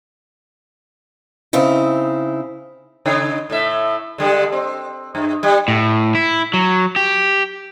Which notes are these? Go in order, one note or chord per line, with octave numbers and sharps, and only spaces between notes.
C#3 C4 D#4 E4
C#3 D#4 C#5
A2 A3 E5
D3 G3 G#3
C4
G2
G3
A2
E4
F#3
G4